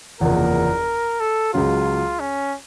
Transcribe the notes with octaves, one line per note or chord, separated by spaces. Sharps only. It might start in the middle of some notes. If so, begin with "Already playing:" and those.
F#1 E2 C3 F3 A#3 A#4
A4
C#2 C#3 F#3 F4
C#4